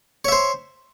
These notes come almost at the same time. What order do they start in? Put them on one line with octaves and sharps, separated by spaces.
C#5 E5 C5